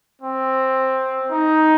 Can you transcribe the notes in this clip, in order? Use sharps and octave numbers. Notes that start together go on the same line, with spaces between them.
C4
D#4